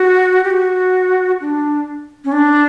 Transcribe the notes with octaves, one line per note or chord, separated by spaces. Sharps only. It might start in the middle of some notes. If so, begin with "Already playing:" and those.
Already playing: F#4
G4
F#4
D4
C#4
D4